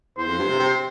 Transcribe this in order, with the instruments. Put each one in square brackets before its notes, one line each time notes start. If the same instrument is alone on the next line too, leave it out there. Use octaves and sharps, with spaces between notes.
[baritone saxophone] E2 [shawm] C5
[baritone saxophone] F2
G2
C3
C3